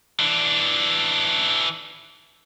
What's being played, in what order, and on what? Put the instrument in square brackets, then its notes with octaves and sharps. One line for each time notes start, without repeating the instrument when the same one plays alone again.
[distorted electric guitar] E3 D4